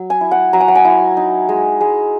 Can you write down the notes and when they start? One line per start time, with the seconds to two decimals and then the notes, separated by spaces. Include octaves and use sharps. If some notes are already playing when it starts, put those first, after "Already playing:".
Already playing: F#3
0.10 G#5
0.21 E4
0.31 F#5
0.53 F#3 A#5
0.60 G#5
0.68 F#5
0.75 G#5
0.85 E4
1.17 D#4
1.49 G#3
1.81 G#3